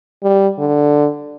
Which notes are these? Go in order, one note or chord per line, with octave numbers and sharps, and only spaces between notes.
G3
D3